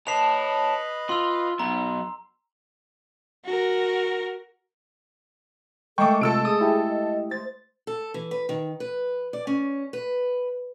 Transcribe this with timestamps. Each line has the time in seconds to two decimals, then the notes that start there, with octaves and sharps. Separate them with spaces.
0.07 B4 C#5 D#5 A5 B5 C7 F7
1.09 F4 C6 E6
1.59 F#3 B3 A#5
3.45 F#4 A#4
5.98 G#3 A3 A4 G5 C#6 D6
6.21 C3 F4 A4 E6 D7
6.45 G#4 D#6
6.61 E4 G4
6.89 D#5
7.31 C5 A6
7.87 A4
8.14 E3
8.31 B4
8.49 D#3
8.80 B4
9.33 D5
9.47 C#4
9.93 B4